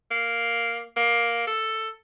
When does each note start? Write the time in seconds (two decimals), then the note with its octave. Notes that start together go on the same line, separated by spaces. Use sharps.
0.11 A#3
0.96 A#3
1.47 A4